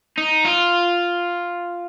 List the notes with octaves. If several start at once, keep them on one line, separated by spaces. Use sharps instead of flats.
D#4
F4